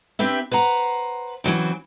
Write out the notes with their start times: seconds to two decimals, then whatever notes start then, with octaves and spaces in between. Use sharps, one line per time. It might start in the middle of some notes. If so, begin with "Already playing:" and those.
0.19 C4 D4 G4 B4 E5
0.51 B4 C5 F#5 A#5
1.44 C#3 E3 F#3 C4